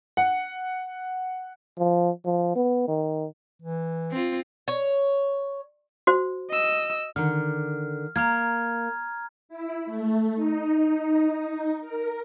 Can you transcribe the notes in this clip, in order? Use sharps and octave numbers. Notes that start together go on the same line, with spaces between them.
F#5
F3
F3
B3
D#3
E3
C4 F4
C#5
F#4 C5
D#5 E6
D3 D#3 F6
A#3 A#5 F6 G#6
E4
A3
D#4
A#4